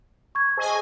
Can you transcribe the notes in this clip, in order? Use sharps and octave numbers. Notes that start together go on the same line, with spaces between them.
C#6 G#6
G#4 C5 D#5 G#5